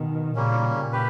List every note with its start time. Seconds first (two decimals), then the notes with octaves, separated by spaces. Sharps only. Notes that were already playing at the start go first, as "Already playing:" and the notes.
Already playing: B2 D#3
0.34 A#2 C#3 G3 A#3 C#4
0.92 G4 B4